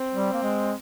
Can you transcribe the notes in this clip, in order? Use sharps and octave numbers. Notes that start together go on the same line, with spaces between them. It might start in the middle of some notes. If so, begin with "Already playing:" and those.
Already playing: C4
G3
A#3
G#3